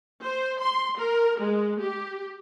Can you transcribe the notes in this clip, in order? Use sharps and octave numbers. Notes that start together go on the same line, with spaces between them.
C5
C6
A#4
G#3
G4